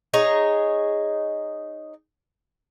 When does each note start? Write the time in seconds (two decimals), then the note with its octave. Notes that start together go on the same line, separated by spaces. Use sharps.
0.14 D#4 G#4 C#5